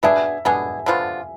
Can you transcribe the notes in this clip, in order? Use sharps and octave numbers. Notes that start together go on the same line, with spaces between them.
B2 B3 D4 G#4 E5
B2 B3 D4 G#4 G#5
D3 F3 B3 F4